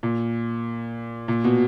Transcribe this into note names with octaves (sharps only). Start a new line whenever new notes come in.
A#2
A#2
B2